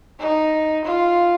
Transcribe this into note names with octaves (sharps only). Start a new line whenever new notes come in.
D#4
F4